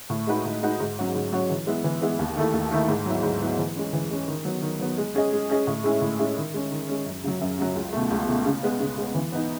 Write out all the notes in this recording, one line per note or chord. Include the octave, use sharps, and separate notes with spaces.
A2
G#3 D#4 F#4 B4
A2
G#3 D#4 F#4 B4
G#2
F#3 C#4 F#4 C#5
G#2
F#3 C#4 F#4 C#5
E3
G#3 B3 E4
E3
G#3 B3 E4
D#2
D#3 A3 E4 A4
D#2
D#3 A3 E4 A4
G#2
F#3 B3 E4
G#2
F#3 B3 E4
E3
G#3 C#4
E3
G#3 C#4
D#3
F#3 B3
D#3
F#3 B3
G#3
C#4 G#4 D#5
G#3
C#4 G#4 D#5
A2
G#3 C#4 E4 G#4
A2
G#3 C#4 E4 G#4
D#3
G#3 C#4
D#3
G#3 C#4
F#2
C#3 F#3
F#2
C#3 F#3
C#2
B2 A3
C#2
B2 A3
C#3
G#3 B3
C#3
G#3 B3
E3
B3 D#4